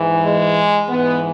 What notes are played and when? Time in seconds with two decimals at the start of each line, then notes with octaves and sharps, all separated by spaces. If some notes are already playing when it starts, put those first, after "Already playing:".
Already playing: G#2 E3
0.22 G#3
0.88 G#2 E3 B3